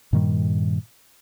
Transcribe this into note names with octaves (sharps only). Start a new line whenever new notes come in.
G2 A#2 D#3 G3